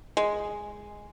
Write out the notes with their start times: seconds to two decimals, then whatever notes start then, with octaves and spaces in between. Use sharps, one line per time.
0.17 G#3